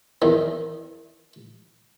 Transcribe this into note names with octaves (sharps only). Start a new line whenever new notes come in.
E2 D#3